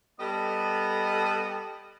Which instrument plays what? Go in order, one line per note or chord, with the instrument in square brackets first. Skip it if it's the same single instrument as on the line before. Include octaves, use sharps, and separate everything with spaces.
[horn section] G3 B3 A4 D#5